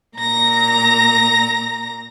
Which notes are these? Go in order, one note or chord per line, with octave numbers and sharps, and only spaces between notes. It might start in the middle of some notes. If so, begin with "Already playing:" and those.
A#2 A#5 A#6